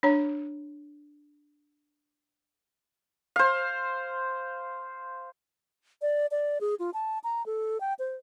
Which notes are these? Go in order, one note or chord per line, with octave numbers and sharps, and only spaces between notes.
D4 C#5 A#5
C5 F5
D5
D5
G#4
F4
A5
A#5
A4
G5
C5